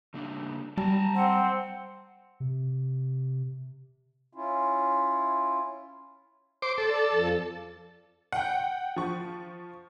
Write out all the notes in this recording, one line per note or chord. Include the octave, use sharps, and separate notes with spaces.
C#3 A#3 D4
G3 G5 A5 A#5
C4 F#5
C3
C#4 E4 F4
C5 D6
A4
D5
F2 F3
F#5 G5
F3 C#6